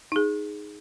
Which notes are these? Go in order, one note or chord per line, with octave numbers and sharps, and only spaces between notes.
D#4 G#4